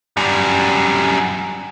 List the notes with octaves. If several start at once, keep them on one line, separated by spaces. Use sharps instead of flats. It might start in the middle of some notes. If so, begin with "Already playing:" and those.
F#2 G3